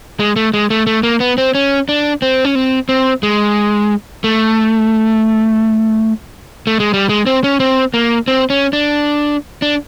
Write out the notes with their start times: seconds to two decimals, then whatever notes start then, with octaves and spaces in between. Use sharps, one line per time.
0.20 G#3
0.36 A3
0.54 G#3
0.70 A3
0.87 A3
1.03 A#3
1.20 B3
1.38 C4
1.55 C#4
1.89 D4
2.22 C4
2.45 C#4
2.55 C4
2.89 C4
3.23 G#3
4.24 A3
6.67 A3
6.80 G#3
6.94 G3
7.09 G#3
7.26 C4
7.44 C#4
7.60 C4
7.94 A#3
8.28 C4
8.50 C#4
8.73 D4
9.62 D4